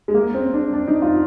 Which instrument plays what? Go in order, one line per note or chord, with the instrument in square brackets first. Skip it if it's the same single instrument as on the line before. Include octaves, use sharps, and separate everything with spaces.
[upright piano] G#3
A#3
C4
D4
D4
D#4
F4